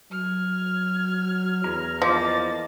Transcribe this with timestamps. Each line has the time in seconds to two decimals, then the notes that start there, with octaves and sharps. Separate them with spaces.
0.11 F#3 F6 G#6
1.64 E2 A#5
2.02 F3 A#3 D#5 D6 A6